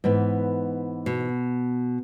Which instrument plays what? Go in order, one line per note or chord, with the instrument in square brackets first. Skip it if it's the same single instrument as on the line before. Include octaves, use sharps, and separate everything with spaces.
[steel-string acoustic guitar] G#2 E3 B3
[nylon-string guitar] B2